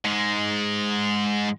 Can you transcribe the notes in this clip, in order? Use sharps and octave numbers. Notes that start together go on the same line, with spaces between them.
G#2 G#3